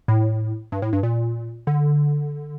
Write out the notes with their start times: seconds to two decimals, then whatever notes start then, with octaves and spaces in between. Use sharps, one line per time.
0.08 A2
0.72 G2
0.82 A2
0.93 G2
1.03 A#2
1.67 D3